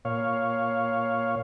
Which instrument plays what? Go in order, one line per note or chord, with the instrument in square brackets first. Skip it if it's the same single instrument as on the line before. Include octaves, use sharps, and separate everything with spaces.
[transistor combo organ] A#2 C#5 F5